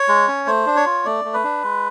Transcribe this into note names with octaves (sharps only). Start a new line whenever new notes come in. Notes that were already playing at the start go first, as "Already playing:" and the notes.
Already playing: C#5
G#3
C#4
A3 C5
D4
C#5
F4
A3 D5
A3
B4
D4
G#3